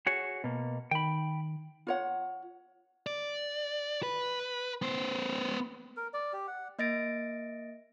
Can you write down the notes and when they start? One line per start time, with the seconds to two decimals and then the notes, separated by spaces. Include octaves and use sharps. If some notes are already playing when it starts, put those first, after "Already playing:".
0.07 F#4 G#4 C#5
0.44 B2 A#3
0.91 D#3 G5 B5
1.87 F4 C#5 F#5
3.07 D5
4.03 B4
4.82 B3 C5
5.97 A#4
6.14 D5
6.33 G4
6.47 F#5
6.79 A#3 D#5 A6 A#6 D7